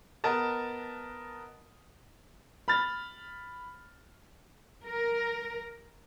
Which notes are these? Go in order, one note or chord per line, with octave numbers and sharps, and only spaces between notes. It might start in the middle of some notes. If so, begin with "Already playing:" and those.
B3 A#4 D#5 A5
B5 F6 A6
A#4